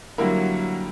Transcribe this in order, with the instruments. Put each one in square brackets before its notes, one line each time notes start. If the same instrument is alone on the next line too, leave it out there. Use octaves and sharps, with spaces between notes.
[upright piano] D3 G3 A#3 E4 A#4 [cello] F#3